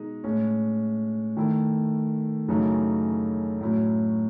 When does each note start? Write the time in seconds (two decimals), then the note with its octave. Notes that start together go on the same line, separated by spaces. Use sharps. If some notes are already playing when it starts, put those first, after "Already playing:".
Already playing: B2 G#3 D#4
0.24 A2 G#3 C#4
1.37 D#3 A3 E4
2.48 F#2 C#3 E3 A3 D#4
3.61 A2 F#3 C#4 E4